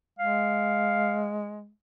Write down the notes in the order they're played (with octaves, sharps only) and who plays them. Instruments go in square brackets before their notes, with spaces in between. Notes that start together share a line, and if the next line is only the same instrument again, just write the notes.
[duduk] G#3 [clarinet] F5